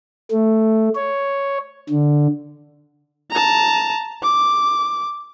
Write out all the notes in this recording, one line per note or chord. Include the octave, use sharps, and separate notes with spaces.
A3
C#5
D3
A5 A#5
D6